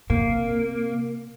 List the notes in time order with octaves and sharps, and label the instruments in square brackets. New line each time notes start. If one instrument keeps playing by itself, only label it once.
[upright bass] C3 [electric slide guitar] A#3